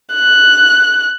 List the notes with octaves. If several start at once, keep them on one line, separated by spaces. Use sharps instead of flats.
F#6